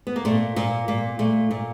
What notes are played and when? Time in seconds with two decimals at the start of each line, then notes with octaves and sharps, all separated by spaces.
0.07 B3
0.16 A#3
0.25 A#2 A3
0.56 A#2 A#3
0.88 A#2 A#3
1.19 A#2 A3
1.51 A#2